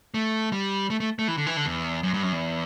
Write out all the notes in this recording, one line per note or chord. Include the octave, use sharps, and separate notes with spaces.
A3
G3
A3
A3
A3
E3
D3
E3
D3
E2
F#2
G2
F#2
E2